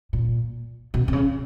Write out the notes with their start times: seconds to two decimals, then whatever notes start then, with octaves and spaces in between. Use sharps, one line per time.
0.13 A#2
0.94 B2
1.08 C3
1.13 C#3